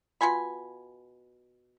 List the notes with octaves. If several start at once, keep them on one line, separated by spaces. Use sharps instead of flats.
B2 F4 G#5 B5